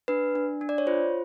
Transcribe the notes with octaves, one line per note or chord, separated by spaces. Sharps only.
D4 B4
D4
D4
D5
C#5
F4 C5